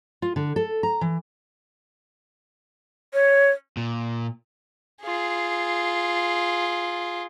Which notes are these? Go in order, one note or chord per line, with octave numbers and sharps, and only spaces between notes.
F4
D3
A4
A#5
E3
C#5
A#2
F4 G#4